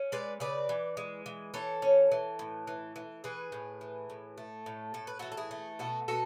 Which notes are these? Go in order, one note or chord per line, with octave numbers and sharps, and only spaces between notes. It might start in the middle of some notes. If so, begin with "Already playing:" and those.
Already playing: C#4
G#3 B4 D5
C#3 B4 D5
E3
G#3
E3
E3 A4 C#5
C#4
E3
A2
E3
E3
E3 G#4 B4
A2
E3
A2
A3
A2
A2 A4
B4
E3 F#4 A4
A4
E4 G#4
A3
B2 F#4 A4
B2 F#4 A4